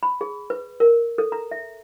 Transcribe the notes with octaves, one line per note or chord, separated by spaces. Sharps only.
B5
G#4
B4
A#4
A4
A#5
E5